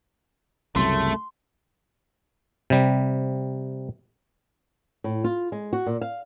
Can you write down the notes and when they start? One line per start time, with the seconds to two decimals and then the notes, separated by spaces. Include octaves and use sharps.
0.76 C2 F#2 C#3 A3 C6
2.70 C3 G3
5.04 A2
5.24 F4
5.52 G#3
5.73 F#4
5.86 A#2
6.01 F5